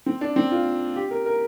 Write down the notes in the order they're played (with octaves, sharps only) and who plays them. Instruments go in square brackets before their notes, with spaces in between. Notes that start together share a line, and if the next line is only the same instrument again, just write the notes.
[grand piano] C4
D4
C4
F4
G4
A#4
A#4